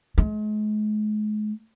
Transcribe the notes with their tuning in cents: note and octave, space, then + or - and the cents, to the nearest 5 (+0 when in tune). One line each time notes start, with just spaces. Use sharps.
G#3 +40